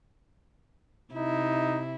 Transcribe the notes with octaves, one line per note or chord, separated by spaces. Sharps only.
C3 D#4 E4